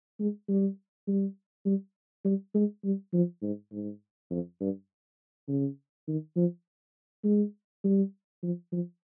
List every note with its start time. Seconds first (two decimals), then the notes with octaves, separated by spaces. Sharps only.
0.20 G#3
0.49 G3
1.08 G3
1.66 G3
2.25 G3
2.55 G#3
2.84 G3
3.14 F3
3.43 G#2
3.72 G#2
4.31 F2
4.61 G2
5.48 C#3
6.08 D#3
6.36 F3
7.24 G#3
7.84 G3
8.43 F3
8.72 F3